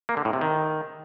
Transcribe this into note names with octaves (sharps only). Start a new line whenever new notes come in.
A#3
D3
A2
C3
D#3